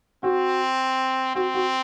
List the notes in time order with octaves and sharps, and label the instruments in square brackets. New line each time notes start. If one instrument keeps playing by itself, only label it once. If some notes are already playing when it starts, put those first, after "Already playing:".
[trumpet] C4 [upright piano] F#4
[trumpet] C4 [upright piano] F#4
[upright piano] F#4